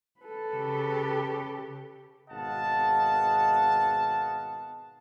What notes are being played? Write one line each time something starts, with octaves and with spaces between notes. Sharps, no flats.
A4 B4
C#3 G4
G#1 B2 D#5 F5 F#5 A5